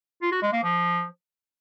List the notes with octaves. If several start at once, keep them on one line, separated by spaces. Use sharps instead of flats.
F4
F#4
G#3
A#3
F3